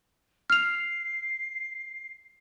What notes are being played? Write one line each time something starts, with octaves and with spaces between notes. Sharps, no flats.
F6 C7 F7